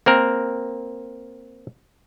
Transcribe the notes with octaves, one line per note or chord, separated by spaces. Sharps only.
A#3 C4 A#4